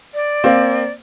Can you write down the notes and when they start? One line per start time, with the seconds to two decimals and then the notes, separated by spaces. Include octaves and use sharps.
0.14 D5
0.44 A#3 C4